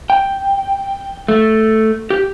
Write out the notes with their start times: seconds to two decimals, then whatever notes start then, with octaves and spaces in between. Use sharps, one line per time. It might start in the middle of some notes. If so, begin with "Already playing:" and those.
0.10 G5
1.28 A3
2.10 G4